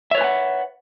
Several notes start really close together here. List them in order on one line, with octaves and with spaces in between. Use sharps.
E5 C#5 B4 G#5 F#5